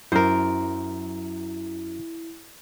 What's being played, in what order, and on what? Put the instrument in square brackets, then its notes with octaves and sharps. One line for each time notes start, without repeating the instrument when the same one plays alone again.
[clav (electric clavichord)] F#2 [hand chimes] E4 [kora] A#4 C5